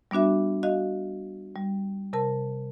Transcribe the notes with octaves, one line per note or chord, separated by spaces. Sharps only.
G3 B3 D4 F#4 E5
F#4 D#5 F5
G3
C3 A#4 A5